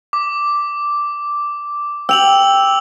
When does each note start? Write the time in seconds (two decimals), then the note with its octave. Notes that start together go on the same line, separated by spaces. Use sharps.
0.13 D6
2.09 G5 E6 F7 F#7